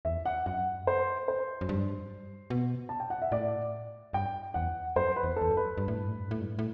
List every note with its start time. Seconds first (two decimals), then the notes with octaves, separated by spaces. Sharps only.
0.05 E2 E5
0.25 F#5
0.46 F#2 F#5
0.87 C5
1.28 C5
1.61 F#2
1.69 G2
2.50 B2
2.89 A5
3.00 G5
3.10 F#5
3.22 E5
3.32 A2 D5
4.13 G2 G5
4.54 E2 F#5
4.96 F#2 C5
5.16 B4
5.23 E2
5.36 A4
5.42 E2
5.51 F#2
5.57 B4
5.77 G2
5.88 A2
5.98 G2
6.09 A2
6.20 G2
6.31 A2
6.41 G2
6.59 A2